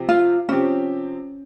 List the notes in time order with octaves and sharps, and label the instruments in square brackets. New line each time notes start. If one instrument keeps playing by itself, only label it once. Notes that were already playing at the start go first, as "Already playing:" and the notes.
Already playing: [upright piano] C3 F3 C4 G4
[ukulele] F4
[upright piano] C3 F3 C4 G4 [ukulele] C#4